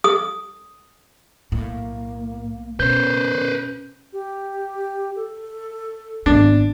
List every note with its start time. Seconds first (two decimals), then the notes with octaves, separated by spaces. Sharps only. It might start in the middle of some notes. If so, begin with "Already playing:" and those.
0.04 D#6
1.52 B1 A2 A#3
2.80 B2 C#4 B4 C5 G6
4.13 G4
5.16 A4
6.26 G#1 B3 D4